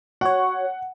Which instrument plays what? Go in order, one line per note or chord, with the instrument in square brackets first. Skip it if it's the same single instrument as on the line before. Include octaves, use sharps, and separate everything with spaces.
[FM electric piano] F#4 C#5 [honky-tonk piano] F#5